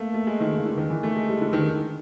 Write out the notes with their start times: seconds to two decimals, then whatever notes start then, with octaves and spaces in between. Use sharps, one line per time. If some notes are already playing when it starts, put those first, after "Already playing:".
Already playing: A3 A#3
0.14 A3
0.27 G#3
0.40 D#3
0.53 C#3
0.65 D3
0.77 D#3
0.90 E3
1.03 A3
1.16 G#3
1.28 G3
1.41 D3
1.53 D#3